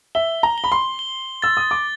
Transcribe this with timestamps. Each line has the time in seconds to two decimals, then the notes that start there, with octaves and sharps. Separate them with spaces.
0.15 E5 G7
0.43 A#5
0.58 G7
0.64 B5
0.72 C6
0.99 G7
1.42 E6 A6
1.57 D#6
1.71 D6